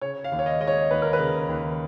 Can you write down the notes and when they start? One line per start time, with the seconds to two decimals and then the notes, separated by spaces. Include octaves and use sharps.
0.02 C#3 C#5
0.24 F5
0.32 D#2
0.39 C#5
0.46 D#5
0.60 G#3 D#5
0.68 C#5
0.90 D#2 B4
1.02 A#4
1.13 B4
1.19 C#3
1.49 D#2